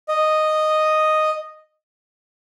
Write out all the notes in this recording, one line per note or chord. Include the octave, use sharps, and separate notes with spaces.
D#5